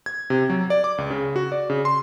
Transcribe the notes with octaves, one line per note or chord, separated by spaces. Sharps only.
G#6
C3
F#3
D5
D6
C#2
C#3
F#4
D5
C#3
C6